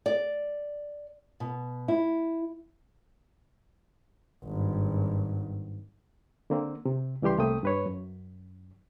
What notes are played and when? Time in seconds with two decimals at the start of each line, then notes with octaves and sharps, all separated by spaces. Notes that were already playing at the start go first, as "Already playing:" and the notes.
0.06 D5
1.40 B2
1.88 E4
4.44 G#1 G2
6.50 D3 A#3 C4
6.85 C3
7.22 C#2 E3 G3 G4 C6
7.38 C2 A3 A#3 C4 G5 D#6
7.63 G2 B4 C#5
7.86 F#2